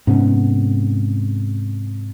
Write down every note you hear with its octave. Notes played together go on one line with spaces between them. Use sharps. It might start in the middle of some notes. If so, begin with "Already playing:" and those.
G#2 C3 B3 C#4